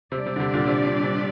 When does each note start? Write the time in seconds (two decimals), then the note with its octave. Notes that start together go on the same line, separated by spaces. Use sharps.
0.12 C3 G3 D4 G4 D5
0.26 C3
0.36 D3
0.40 C3
0.54 A#2 D3
0.67 C3
0.86 A#2
1.04 C3